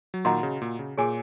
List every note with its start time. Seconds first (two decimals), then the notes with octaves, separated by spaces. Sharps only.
0.14 F#3
0.25 A#2 D#3 F#4 D#5 F#5 A#5
0.43 C#3
0.62 A#2
0.79 C#3
0.98 A#2 G#4 C#5 G#5